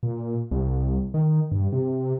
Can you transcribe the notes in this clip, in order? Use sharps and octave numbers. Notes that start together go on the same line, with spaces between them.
A#2
C2
D#3
G2
C3